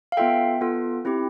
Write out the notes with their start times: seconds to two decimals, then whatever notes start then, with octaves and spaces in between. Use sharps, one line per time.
0.12 F5
0.17 B3 F4 A4 E5 G5
0.61 B3 F4 A4
1.05 C4 E4 G4